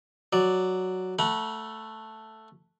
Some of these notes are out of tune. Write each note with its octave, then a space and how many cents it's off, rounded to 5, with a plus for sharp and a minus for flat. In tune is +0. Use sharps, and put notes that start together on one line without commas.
F#3 +0 D5 +0
A3 +0 F#5 +0 B5 -45